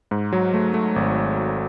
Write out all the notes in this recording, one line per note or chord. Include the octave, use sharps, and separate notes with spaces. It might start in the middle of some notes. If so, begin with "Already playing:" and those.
G#2
F#3
A3
A3
G#1